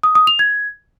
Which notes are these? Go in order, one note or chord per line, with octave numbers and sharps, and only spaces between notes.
D#6
D#6
F7
G#6